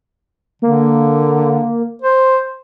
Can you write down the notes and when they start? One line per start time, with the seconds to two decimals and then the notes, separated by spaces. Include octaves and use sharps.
0.62 D3 A#3
2.02 C5